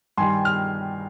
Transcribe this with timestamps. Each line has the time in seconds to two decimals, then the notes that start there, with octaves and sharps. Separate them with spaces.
0.18 G2 D#3 G3 G#5 C6
0.45 F6